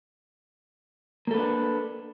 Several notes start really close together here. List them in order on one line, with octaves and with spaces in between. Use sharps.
A#3 A4 B4 D4